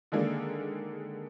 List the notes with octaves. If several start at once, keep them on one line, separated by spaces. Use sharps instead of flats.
D3 D#3 G#3 A#3 D4